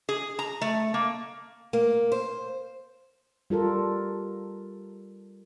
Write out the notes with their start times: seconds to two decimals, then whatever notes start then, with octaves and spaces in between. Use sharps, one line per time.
0.09 G#4
0.39 A#5
0.61 A3
0.94 A#3
1.73 A#3
2.12 C5
3.50 G3 F4 A4 A#4